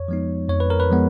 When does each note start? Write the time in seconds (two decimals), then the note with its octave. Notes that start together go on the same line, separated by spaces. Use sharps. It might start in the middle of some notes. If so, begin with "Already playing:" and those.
Already playing: F2 C#5
0.08 F3 G#3 B3 D#4
0.49 F2 C#5
0.60 B4
0.70 A#4
0.80 B4
0.90 F3 G#3 B3